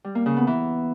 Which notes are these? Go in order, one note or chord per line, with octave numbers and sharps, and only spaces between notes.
G3
A#3
C#3
B3
E3